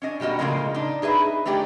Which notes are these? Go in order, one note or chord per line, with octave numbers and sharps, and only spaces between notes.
C#4 D4 D#5
B2 G3 A#3 F#4 D#5
A2 C#3 F3 G#3 A#3 D#5
D4 D#4
D#4 G#4 B4 E5
A3 D4 D#4 G4 G#4